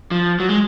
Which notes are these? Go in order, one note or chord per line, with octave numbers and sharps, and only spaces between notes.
F3
F#3
G#3